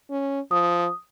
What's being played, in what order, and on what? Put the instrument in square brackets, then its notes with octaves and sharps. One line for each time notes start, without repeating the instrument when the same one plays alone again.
[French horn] C#4
[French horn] F3 [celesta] D#6